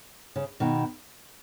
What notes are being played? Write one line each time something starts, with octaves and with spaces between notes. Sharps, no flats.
C#3
B2 D#3